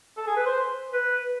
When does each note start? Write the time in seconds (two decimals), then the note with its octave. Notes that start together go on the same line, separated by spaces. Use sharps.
0.17 A4
0.27 G#4
0.36 B4
0.46 C5
0.93 B4